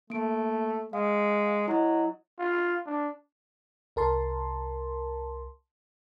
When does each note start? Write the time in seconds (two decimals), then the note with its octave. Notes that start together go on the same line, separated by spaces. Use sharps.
0.10 A3 A#3 D7
0.93 G#3 F5
1.68 F#3 E4 D#5
2.39 F4
2.86 D4
3.96 C2 A#4 A5 C6